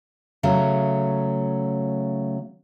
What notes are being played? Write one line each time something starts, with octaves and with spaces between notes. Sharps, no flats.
C#3 F#3 A3 C#4